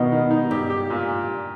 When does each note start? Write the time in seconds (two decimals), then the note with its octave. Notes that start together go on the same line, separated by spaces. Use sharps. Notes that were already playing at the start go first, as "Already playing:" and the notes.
Already playing: B2 D#3 D#4
0.12 D#3
0.31 D#4
0.51 G2 G4
0.70 G4
0.90 A#2